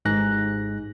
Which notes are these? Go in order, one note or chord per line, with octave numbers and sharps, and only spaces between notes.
G#1 G#2 F#6 A#6